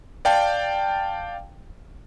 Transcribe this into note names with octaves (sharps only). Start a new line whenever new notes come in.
D5 F5 G5 A5